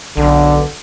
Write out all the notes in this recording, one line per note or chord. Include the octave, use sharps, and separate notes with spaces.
B1 D3